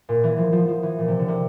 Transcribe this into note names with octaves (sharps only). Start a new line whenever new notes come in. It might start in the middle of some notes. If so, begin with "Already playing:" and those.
A#2
E3
F3
F3
F3
E3
A#2
C3
D3
C3